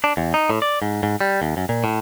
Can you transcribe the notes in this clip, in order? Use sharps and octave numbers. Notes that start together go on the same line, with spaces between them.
D4
E2
D#4
A2
D5
G#2
G#2
G3
D#2
F#2
A#2
A2